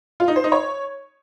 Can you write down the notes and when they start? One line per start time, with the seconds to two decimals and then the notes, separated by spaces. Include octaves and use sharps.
0.20 F4
0.28 D#4
0.36 C5
0.44 D#4
0.52 C#5